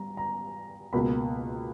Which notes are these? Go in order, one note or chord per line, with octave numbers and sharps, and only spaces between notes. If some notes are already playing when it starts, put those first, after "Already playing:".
Already playing: G3 A#5
A#5
C#2 B2 A#3 B5